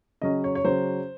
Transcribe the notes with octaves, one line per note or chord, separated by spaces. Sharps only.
C#3 F#3 C#4 D#5
C#5
C#5
C#3 F#3 C#4 C5